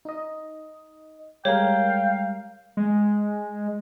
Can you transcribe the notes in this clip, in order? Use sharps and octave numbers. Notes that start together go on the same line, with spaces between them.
D#4 D#5
G3 G#3 A#4 C#5 F5 G5
G#3